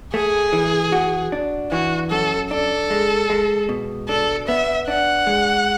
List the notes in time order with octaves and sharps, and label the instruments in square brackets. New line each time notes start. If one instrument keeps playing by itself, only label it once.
[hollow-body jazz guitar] A3 [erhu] G#4
[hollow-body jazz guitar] E3
F#4
D4
[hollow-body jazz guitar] E3 [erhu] F#4
[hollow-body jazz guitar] F#2 [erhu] A4
[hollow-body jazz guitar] D4 [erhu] A4
[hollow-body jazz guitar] G#3
G#3
B2
[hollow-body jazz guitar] D4 [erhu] A4
[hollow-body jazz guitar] B3 [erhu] E5
[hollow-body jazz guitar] D4 [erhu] F#5
[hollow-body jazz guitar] G#3